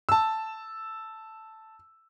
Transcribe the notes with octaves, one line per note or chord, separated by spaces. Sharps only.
A5 E6